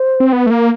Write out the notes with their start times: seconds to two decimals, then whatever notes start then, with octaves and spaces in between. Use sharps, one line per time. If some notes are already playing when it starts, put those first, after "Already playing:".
Already playing: C5
0.20 C4
0.33 B3 B4
0.46 A3
0.50 A#3 A#4